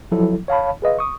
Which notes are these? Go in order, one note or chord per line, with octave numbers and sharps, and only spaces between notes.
F3 F#3 E4 A4
C#5 F5 A5 B5
G#4 B4 D#5 F5
C#6 D#6